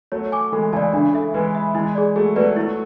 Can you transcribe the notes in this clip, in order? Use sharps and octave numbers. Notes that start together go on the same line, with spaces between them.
F#3 A3 C#5
G#5 D6
E3 G#3 A4
C#3 E3 D5 A5
C#3 E3 D4
A4 E5
E3 G#3 B4
E5 B5
E3 G#3 E4
G#4 D5
F#3 A3 G#4
F#3 A3 B4 D5
F#3 A3 E4